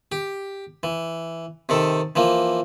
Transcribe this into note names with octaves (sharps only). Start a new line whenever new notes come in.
G4
E3
C3 D#3 A4
E3 F3 A#3